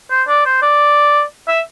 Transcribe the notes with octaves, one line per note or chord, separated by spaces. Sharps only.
C5
D5
C5
D5
E5